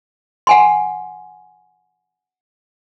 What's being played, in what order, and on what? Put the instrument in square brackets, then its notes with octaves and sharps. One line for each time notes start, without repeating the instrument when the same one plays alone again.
[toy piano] F#5 G#5 C6